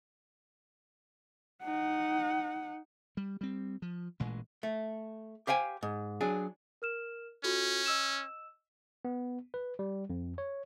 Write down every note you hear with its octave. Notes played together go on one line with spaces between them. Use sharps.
D#4 F#5
G3
G3 C4
F3
A1 A#2 E3 G#3
A3
G4 C5 F5 G5 G#5
G#2
F#3 D4 G#4
A#4 F6 E7
C#4 F4 F#4 A4
D#5 E6 E7
B3
B4
G3
F2
C#5